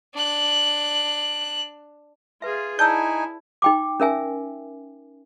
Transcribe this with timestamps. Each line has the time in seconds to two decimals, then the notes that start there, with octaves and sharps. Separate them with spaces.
0.14 D4 F#6
2.42 F4 G#4 B4 E5
2.79 D#4 E4 D5 G#5 A5 E6 G6
3.62 D#4 G5 D6
4.00 C#4 A#4 E5 G#5